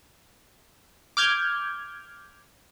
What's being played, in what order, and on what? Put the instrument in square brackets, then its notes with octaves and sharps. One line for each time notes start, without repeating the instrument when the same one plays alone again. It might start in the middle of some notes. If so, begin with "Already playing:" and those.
[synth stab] D6 F6 G6 G#6